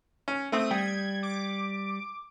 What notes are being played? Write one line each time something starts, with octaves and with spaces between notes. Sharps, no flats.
C#4
A3 C4 D#6
G3 G5 G#6
D6